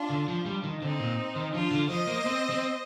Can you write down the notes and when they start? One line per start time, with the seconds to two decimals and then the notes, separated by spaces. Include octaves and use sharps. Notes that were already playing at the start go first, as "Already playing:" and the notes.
Already playing: D4 F4
0.10 D3
0.28 F3
0.46 G3
0.64 D#3
0.82 D3 C4 D#4
1.00 A#2
1.36 D#3
1.53 F3 D4 F4
1.71 D3
1.89 F3 C5 D#5
2.07 A#3
2.26 C4
2.50 C4